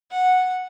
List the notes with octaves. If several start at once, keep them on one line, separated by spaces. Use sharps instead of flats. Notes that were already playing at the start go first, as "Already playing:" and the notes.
F#5